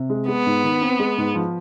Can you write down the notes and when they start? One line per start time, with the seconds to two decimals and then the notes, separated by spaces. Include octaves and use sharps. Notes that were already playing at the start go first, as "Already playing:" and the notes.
Already playing: C3
0.09 G#3
0.28 G#3 B3
0.46 G#2
0.64 D#3
0.81 C4
0.99 G#3
1.18 G#2
1.35 F3